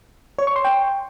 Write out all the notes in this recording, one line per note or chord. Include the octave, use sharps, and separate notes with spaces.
C#5
C#6
C6
G5